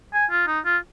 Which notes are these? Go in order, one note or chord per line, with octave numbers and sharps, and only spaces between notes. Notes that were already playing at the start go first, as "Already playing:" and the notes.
G#5
F4
D#4
F4